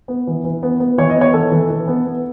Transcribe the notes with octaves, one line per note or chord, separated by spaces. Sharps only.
B3
E3
E3
B3
B3
E3 C#5
D#5
B3 C#5
E3 A4
E3
E3
B3
B3